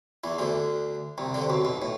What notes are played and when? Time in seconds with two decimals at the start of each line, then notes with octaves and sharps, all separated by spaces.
0.24 E2 E3
0.39 D2 D3
1.18 C2 C3
1.34 D3
1.42 C3
1.50 B1 B2
1.65 B1 B2
1.82 A2